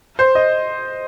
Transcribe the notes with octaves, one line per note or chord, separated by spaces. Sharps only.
C5
D#5